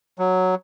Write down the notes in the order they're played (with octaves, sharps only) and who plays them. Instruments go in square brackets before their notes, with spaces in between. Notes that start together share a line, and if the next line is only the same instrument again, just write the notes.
[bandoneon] F#3